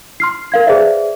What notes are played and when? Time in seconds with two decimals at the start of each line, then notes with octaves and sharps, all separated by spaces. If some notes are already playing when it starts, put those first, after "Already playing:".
0.20 C6 F6 C7
0.52 A#4 F5 G#6
0.67 G#4 B4 C5 D5 E5